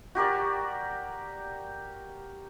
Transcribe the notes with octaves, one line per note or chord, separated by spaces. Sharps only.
F#4 G4 A#4 D5